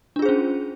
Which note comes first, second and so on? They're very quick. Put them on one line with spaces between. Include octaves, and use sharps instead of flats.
D4 F4 G#4 C5 C#4